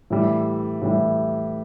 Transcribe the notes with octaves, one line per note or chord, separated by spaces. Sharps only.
A2 E3 G3
A2 E3 G3